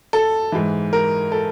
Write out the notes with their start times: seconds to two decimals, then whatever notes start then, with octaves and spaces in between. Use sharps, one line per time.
0.13 A4
0.52 G#2 E3
0.93 A#4
1.32 A4